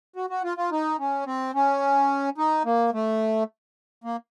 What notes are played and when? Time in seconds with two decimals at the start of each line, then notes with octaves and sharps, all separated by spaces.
0.16 F#4
0.30 F#4
0.44 F4
0.57 F4
0.72 D#4
0.99 C#4
1.26 C4
1.55 C#4
2.38 D#4
2.65 A#3
2.94 A3
4.04 A#3